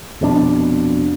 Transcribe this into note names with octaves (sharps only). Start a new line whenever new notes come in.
F1 F2 B2 D4